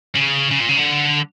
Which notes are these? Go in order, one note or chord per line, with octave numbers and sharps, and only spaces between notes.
C#3
C#3
A#2
C#3
D3